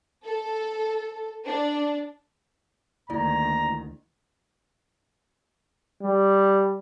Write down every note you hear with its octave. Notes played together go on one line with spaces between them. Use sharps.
A4
D4
D2 D#3 A#3 E4 D5 A#5
G3